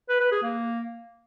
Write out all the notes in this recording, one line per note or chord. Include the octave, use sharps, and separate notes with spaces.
B4
B4
G#4
A#3